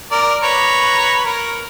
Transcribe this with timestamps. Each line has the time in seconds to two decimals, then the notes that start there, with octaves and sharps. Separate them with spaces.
0.11 A#4 D5
0.43 B4 C#5 A#5
1.25 A#4